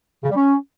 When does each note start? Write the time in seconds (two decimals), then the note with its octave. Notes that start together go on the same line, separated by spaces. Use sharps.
0.24 C#3
0.30 G3
0.36 C#4